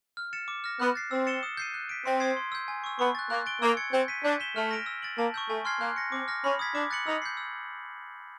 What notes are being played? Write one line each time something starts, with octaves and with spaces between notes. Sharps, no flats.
F6
A6 C#7 E7
D6
F6 A#6
B3 F#6
A6 C7
C4 E6
A6 C#7 E7 G7
D#6
G6 C7 D#7
F#6
B6 D7
C4 C6
D#6 G#6 C7
C6
E6 G6
G#5
C#6 E6
B3 C#6
F#6 A6
A#3 F#6
A6 D7 G7
A#3 E6
G#6 C#7
C4 G6
B6 D#7
D4 G6
B6 E7 G7
A3 F6
A#6 D7 F7
E6
A6 D7 F#7
A#3 A5
C#6 E6 G6
A3 G#5
C6 F6 G#6 C7
A#3 F#6
A#6 C#7
C4 D6
F6 A#6
C#4 B5
D#6 G#6 B6
D4 D6
F#6 A6 C#7 F#7
D#4 E6
G6 C7
E6